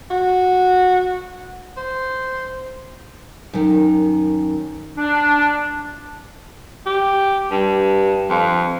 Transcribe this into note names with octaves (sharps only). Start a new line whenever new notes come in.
F#4
C5
F#2 D#3
D4
G4
G2
F2